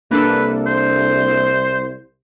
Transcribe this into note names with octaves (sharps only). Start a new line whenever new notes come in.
C2 A#3 D4 A4 B4
C5